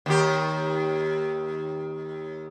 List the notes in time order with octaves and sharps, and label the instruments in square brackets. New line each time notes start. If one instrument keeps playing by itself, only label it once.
[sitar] D#2 D#3 G4